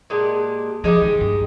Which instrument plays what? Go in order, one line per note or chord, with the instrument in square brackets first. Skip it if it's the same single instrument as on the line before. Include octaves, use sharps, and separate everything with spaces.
[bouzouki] A#2 G#3 D4 G4
[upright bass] F3 [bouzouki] G#3 D#4 G4
[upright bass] D#3
G2